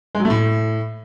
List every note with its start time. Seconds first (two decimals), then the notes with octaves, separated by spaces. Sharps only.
0.15 G#3
0.20 F#3
0.25 A3
0.30 A2